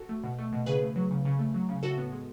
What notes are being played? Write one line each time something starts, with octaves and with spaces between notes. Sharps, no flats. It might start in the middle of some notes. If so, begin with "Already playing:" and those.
Already playing: F#4 A4
A3
B2
A3
B2
C#3 G#4 B4
A3
F#3
C#3
C#3
A3
F#3
C#3
A2 F#4 A4
B3
G#3